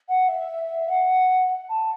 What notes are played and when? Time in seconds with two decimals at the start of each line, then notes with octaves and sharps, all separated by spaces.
0.08 F#5
0.29 E5
0.89 F#5
1.69 A5